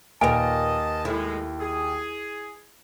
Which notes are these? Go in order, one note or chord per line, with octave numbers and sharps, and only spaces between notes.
D#2 A#2 A#3 A#4 B4 D#5 G#5 A5
A2 G#3 E4
G#4